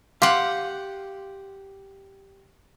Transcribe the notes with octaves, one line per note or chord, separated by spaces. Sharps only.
G4 F5 F#5 C6